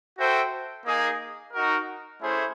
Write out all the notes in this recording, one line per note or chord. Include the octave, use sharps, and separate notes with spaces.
F#4 A4 C5 E5 G5
A#3 D#4 G#4
D#4 F#4 A#4
A3 C#4 E4 G#4 C5